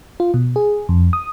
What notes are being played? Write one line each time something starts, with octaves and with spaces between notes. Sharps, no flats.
F4
B2
G#4
F2
D#6